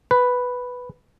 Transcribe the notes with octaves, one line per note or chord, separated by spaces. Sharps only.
B4